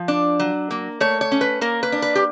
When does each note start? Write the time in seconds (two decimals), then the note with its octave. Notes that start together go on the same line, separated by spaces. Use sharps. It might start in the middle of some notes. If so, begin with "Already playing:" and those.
Already playing: F3
0.08 D4
0.40 F#3
0.71 A#3
1.01 A3 C#5
1.21 C#5
1.32 C#4
1.41 B4
1.61 A#3 A#4
1.83 B4
1.92 D4
2.02 B4
2.15 G4